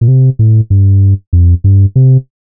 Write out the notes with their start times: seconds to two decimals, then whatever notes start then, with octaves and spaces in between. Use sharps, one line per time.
0.01 A#2
0.08 C3
0.39 A2
0.70 G2
1.33 F2
1.64 G2
1.96 C3